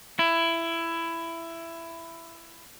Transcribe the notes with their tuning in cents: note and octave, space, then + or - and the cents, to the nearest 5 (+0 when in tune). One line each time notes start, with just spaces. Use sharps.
E4 +15